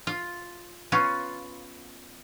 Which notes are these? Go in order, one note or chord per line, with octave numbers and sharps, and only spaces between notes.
F4
B3 C#4 F4